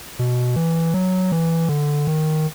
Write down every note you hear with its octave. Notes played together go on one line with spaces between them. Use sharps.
B2
E3
F#3
E3
D3
D#3